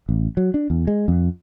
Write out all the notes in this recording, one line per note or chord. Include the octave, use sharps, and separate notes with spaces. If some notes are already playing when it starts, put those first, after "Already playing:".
A1
F#3
D4
E2
G#3
F2